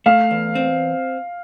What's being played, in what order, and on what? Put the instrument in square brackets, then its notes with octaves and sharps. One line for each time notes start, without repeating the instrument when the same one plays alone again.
[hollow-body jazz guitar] A3 [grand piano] F5
[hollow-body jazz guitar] E2
C4